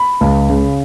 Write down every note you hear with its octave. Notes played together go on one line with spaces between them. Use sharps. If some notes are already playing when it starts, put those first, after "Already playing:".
Already playing: B5
C#2
C#3